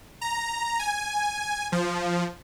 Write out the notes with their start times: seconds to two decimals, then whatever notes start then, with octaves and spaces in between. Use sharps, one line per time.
0.21 A#5
0.79 G#5
1.72 F3